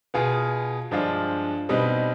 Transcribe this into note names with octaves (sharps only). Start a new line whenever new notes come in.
B2 B3 F4 G#4
G2 F3 G#3 D4 F4
B2 G3 C4 D#4 B4